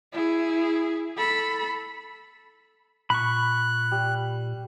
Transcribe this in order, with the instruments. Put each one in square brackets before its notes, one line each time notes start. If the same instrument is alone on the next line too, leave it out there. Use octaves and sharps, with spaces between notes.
[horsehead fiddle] E4 G#4
A4 B5
[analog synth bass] A#2 [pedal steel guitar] B5 C#6 [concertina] F#6
[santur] G3